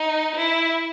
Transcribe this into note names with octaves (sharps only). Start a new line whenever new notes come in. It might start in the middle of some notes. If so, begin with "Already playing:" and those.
Already playing: D#4
E4